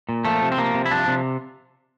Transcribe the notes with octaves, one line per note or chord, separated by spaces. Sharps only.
A#2
F3 A3
C3
C4
F3 A#3
C3
E4
F3 D4
C3